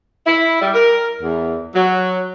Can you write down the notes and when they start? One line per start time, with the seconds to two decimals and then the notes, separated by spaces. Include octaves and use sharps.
0.26 E4
0.61 G3
0.74 A#4
1.21 E2
1.75 F#3